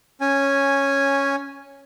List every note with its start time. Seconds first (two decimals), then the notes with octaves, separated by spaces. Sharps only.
0.21 C#4 G#5